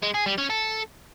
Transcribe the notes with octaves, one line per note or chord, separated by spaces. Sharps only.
G#3
G#4
G3
C#4
A4